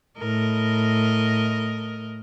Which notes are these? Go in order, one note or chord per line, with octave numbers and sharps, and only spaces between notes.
A2 A#4 D#5